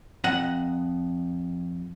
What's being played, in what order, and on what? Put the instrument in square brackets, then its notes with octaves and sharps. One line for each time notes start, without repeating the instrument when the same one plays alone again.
[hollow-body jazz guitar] F2 D#5 F#5